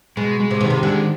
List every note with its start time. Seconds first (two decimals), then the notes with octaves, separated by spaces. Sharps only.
0.17 B2 G#3
0.40 G#3
0.51 C3
0.61 B2 D#3
0.70 C3
0.83 D3 G#3